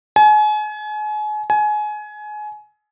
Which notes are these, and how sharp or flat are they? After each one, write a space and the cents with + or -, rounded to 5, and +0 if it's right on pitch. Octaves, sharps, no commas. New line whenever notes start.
G#5 +35
G#5 +25